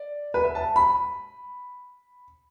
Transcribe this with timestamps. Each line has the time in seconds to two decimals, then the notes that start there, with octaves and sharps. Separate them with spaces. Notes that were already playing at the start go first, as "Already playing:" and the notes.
Already playing: D5
0.34 B4
0.44 E5
0.55 A5
0.76 B5